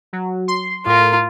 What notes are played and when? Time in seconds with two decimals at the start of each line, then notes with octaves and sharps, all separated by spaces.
0.13 F#3
0.48 C6
0.86 A2 F4 A#4